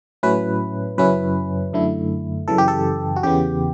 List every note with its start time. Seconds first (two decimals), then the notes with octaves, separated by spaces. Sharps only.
0.23 A2 F#3 C#4 E4 B4
0.98 F#2 C#3 F#3 C#4 E4 B4
1.73 F#2 D3 A3 E4
2.48 F#2 C#3 E3 A4
2.58 G4
2.68 A4
3.16 F#4
3.23 E2 C#3 E3 B3 G4